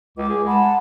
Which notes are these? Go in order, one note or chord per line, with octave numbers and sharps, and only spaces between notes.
C#2 D6
G#4
G#3 F#5 A5 B5